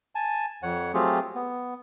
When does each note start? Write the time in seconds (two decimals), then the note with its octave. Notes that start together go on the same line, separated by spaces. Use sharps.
0.15 G#5 A5
0.63 F2 C#5 F#5
0.94 F#3 A3 C4 F4 G4 G#4
1.35 B3